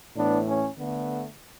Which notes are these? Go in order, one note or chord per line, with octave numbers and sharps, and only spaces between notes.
A2 E3 A3 B3 D4
C#4
D3 A3 B3